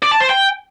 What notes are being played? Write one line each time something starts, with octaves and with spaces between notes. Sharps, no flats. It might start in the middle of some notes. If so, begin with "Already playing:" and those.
D5
A5
C5
G5